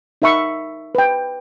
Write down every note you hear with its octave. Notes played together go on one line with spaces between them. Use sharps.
D#4 A#4 E5 B5 C#6
B4 G5